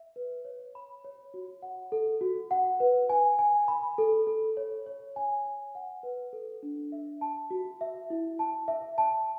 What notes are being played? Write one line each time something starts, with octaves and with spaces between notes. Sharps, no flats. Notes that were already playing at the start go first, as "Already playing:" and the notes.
Already playing: E5
B4
C#5
B5
C#5
F#4
F#5
A4
F#4
F#5
B4
G#5
G#5
B5
A4
A4
C#5
C#5
G#5
G#5
F#5
B4
A4
D4
E5
A5
F#4
E5
E4
A5
E5
A5